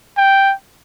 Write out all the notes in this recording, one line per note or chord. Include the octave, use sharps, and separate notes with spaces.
G5